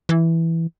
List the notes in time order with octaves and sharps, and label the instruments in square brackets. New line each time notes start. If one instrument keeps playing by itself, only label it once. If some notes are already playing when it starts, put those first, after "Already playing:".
[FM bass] E3